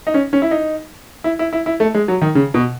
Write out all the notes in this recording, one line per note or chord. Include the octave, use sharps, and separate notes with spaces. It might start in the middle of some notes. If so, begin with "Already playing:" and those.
D#4
C#4
C#4
E4
D#4
E4
E4
E4
E4
A3
G#3
F#3
D#3
C#3
B2